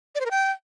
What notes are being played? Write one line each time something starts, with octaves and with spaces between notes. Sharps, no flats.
D5
C5
A#4
G5